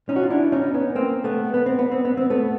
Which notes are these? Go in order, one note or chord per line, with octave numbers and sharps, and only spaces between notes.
C#4 D#4
F#4
F4
D4 E4
C#4 D#4
B3 C#4
A#3 C4
A3 B3
B3
C4
B3
C4
B3
C4
A3 B3